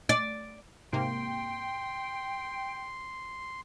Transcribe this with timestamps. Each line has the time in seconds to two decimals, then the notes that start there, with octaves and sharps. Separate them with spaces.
0.09 D5
0.93 G#2 C3 A#3 G5 C6